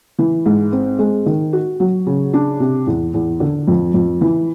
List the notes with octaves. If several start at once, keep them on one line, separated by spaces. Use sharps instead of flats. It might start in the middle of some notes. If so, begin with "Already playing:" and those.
E3
G#2
C4
G#3
D#3
F#4
F#3
C#3
D4
C3
E2
E2
D3
F2
F2
E3